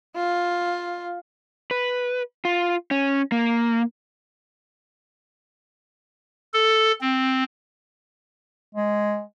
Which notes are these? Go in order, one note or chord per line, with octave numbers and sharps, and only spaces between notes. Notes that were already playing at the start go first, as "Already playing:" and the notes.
F4
B4
F4
C#4
A#3
A4
C4
G#3